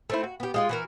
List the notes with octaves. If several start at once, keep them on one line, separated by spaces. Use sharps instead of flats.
A3 C4 E4
F#4
B3 G4
G#3 F4 D#5
E3 F#4 A#4